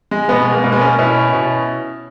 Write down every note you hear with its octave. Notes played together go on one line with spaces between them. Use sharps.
G#3
B2 G#3 B3
G#3
A#3
B2 A#3
G#3 B3
A#3 C#4
B2 C#4 E4
B2